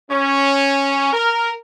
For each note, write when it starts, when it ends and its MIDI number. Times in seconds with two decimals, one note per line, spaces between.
0.11 1.13 61
1.13 1.52 70